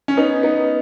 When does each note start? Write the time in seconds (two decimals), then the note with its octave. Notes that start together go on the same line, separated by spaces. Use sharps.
0.08 C#4
0.17 B3 D#4
0.43 B3 D#4